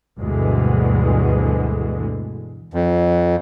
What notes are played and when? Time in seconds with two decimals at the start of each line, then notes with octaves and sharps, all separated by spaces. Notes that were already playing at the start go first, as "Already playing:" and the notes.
0.19 D2 G2 B2 D3 E3 G#3
2.74 F2